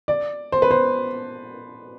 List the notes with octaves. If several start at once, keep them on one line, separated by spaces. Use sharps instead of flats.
D5
C5
B4
C5